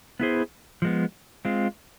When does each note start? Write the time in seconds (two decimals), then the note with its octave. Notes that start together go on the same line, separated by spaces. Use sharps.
0.20 B3 E4 G#4 C5
0.82 F3 G#3 B3
1.45 G#3 C4 F4